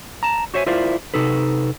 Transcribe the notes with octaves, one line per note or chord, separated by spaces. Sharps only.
A5 A#5
F#4 C5 C#5 E5 F#5 G#5
E4 F4 A#4 C5 D5 F5
C3 D#4 A4 B4